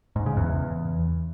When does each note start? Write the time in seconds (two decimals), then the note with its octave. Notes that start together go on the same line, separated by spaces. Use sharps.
0.16 G#2
0.26 C#3
0.37 E2